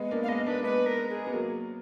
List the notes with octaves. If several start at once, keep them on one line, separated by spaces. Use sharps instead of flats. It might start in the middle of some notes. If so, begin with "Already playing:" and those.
Already playing: G#3 B3
A#3 D4
F5
G#3 B3 D#5
A#3 D4 B4
G#3 B3 B4
A#4
G#4
B3
F#3 A#3